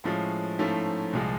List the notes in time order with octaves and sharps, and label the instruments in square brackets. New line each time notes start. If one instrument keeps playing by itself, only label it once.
[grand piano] A2 F3 G#3 C#4
G#2 F3 A3 C#4 E4
C2 A#2 F3 G#3